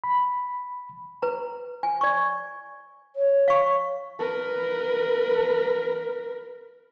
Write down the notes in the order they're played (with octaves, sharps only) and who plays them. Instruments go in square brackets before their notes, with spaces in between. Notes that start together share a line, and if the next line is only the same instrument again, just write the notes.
[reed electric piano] B5
[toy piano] B4 A#5
G#5
D5 C#6
[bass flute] C#5
[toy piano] F5 C#6
[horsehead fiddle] A#4 B4